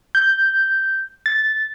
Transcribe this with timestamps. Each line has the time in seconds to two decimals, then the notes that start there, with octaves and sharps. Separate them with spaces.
0.15 G6
1.26 A6